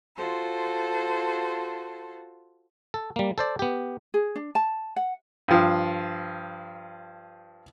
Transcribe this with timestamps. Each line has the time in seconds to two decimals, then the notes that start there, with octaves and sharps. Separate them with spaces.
0.16 F4 F#4 A4 C5
2.94 A4
3.16 G3 A#3
3.38 A4 C5 D5
3.59 B3 G4
4.14 G#4
4.36 D4
4.55 A5
4.96 F#5
5.48 G2 F3